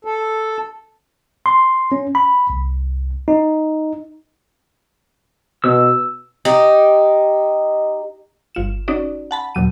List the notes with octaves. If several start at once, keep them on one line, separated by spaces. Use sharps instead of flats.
A4
C6
C#4
B5
C2
D#4
B2 E6
D#4 G4
G1 F4 E7
C#4 D#4 F#4 D5
F#5 A5 B5
D#2 A#2 F#3 D#7